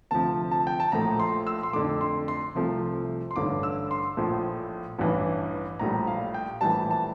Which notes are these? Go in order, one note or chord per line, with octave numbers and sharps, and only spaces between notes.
D2 C3 F3 A5
A5
G5
A5
A#1 A2 F3 A3 A#5
C6
E6
C6
F2 D3 A3 D6
C6
C6
C2 C3 F3 A3
C6
A1 G2 D3 D6
E6
C6
A#1 A2 F3 A3
A1 G2 E3
A#1 A2 G3 A#5
F5
G5
A#1 A2 E3 G3 A5
A5